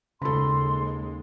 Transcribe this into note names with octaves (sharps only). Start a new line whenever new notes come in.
D#2 C#3 G#3 A4 B5 C6